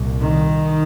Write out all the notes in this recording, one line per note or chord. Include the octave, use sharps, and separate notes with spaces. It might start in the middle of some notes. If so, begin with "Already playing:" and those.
Already playing: C2 A#2
D#3